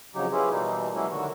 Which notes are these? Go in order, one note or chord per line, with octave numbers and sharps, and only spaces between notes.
F2 C#3 F#3 D#4 G4
B3 C#4 E4 F4 G4 G#4
B2 E3 G3 A#3 D#4
E3 F#3 G#3 A#3 C#4 E4
D3 D#3 F#4